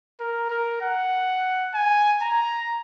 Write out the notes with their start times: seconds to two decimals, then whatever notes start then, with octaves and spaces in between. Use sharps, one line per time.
0.20 A#4
0.50 A#4
0.81 F#5
1.74 G#5
2.22 A#5